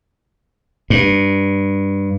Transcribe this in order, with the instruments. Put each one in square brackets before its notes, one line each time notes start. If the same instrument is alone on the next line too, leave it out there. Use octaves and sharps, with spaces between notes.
[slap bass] G2